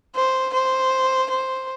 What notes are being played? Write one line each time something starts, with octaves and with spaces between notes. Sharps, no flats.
C5
C5
C5